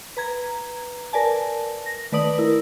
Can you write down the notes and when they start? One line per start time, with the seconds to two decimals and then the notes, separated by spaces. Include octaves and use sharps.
0.17 B4 A#5 G#6
1.13 A#4 B4 D5 G#5 A5
1.86 A#6
2.12 D#3 A3 B4 D5 D#6 F#7
2.38 E4 A#4